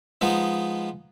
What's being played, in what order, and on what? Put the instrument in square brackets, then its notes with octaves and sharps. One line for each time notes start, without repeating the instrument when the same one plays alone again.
[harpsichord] F3 G#3 B3 D#4